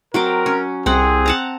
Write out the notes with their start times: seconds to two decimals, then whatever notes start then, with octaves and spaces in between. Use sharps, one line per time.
0.14 F#3 C4 A#4 D6
0.46 C#4
0.86 C2 C4 G#4 F#5
1.26 F#5 A5 A#5